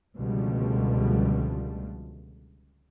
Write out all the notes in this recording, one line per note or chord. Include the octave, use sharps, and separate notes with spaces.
C#2 B2 D3 F3 G3 A3